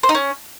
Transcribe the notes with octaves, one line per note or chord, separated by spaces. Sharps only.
C5
D#4
C#4